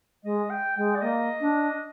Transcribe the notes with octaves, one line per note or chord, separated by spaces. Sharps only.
G#3 D#5
G5
G#3 G5
D5
A#3 D#5
D4